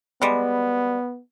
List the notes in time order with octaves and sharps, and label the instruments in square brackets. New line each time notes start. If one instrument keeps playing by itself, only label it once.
[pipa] G3 G#3 [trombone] B3